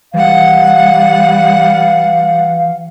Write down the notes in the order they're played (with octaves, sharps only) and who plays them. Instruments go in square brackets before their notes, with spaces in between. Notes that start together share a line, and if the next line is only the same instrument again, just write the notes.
[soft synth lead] E3 [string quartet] G3 F#5 [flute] F5